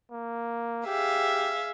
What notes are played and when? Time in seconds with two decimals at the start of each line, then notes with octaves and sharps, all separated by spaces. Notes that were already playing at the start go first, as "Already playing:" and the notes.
0.11 A#3
0.87 G4 G#4 E5 F5